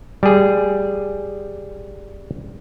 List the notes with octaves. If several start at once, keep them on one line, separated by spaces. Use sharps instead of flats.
G3 G#4